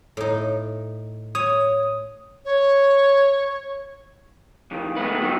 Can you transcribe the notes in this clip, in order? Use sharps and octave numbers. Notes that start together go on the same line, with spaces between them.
A2 D#4
C#5 D#6
C#5
F2 D#3
D2 D#3 G#3 A3 B3 B4
D#3 F#3 B3 C4 D#4